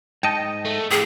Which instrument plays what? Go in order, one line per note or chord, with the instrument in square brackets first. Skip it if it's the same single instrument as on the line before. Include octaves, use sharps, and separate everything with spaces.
[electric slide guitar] G#2 D#5 [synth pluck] G5 A5 C#7
[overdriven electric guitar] A3
[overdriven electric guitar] A2 G4 [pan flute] G#4